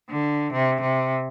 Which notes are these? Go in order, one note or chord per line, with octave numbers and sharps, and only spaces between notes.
D3
C3
C3